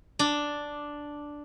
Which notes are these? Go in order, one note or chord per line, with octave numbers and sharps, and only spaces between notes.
D4